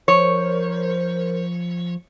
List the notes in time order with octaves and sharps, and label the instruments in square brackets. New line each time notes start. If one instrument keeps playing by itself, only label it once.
[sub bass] F3 [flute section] A#4 C5 [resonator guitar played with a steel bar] C#5